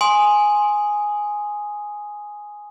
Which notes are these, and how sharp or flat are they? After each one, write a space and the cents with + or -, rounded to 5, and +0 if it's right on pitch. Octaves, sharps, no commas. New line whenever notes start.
G#5 +0 C6 +10 D#6 +0